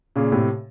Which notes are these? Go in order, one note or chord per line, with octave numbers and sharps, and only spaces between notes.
A#2 C#3
A2 C3